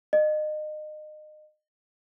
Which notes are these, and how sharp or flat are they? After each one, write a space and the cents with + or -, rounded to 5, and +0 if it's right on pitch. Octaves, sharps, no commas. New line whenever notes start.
D#5 -30